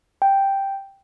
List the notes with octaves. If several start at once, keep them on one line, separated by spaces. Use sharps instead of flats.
G5